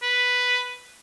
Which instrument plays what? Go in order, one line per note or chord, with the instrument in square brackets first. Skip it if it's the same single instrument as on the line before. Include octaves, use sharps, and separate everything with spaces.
[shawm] B4